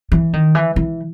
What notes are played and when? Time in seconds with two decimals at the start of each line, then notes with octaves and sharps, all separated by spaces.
0.12 E3
0.33 D#3
0.55 E3
0.76 E3